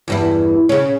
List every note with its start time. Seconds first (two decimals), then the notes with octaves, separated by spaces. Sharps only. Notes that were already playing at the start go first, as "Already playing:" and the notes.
0.08 E2 G2 E4
0.69 C#3 C#4